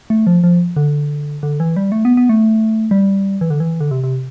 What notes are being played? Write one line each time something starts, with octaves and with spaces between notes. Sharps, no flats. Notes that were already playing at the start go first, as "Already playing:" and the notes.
A3
F3
F3
D3
D3
E3
G3
A3
B3
B3
A3
G3
E3
D3
E3
D3
C3
C3